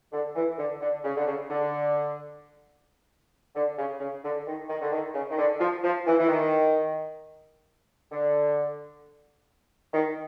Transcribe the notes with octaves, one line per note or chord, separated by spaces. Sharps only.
D3
E3
D3
D3
C#3
D3
C#3
D3
D3
C#3
C#3
D3
D#3
D#3
D3
D#3
C#3
D#3
D3
F3
F3
E3
E3
D#3
D3
D#3